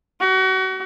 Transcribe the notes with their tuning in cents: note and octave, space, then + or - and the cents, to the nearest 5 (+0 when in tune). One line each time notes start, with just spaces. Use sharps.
F#4 +35